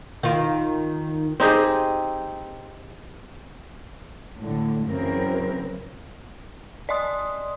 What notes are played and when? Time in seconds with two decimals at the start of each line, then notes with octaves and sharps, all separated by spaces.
0.23 D#3 F4
1.40 C4 D#4 G4 G#4
4.39 A2 D3
4.85 F#2 C#3 E3 C4 A#4
6.89 D5 D#5 C6 D#6